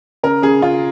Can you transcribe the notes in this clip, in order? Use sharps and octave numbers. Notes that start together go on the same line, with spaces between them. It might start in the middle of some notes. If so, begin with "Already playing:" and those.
C#3 A#4
C#3 G#4
C#3 F4